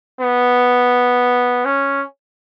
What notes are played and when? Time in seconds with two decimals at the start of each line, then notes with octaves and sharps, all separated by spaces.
0.21 B3
1.65 C#4